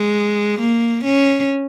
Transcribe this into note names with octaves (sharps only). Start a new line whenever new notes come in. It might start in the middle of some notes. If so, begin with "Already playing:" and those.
Already playing: G#3
A#3
C#4